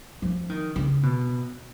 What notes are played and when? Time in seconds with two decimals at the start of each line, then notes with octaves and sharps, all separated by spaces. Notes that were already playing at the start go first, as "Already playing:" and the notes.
0.22 F3
0.49 D#3
0.76 C#3
1.03 B2